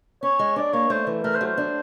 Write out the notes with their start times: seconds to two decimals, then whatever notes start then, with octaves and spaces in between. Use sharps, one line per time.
0.23 C#4 C#5
0.39 G#3
0.56 D4 D5
0.73 A#3 C#5
0.90 A3 C5
1.07 E3
1.24 A3 A#4
1.35 C5
1.41 F#3
1.46 C5
1.58 D4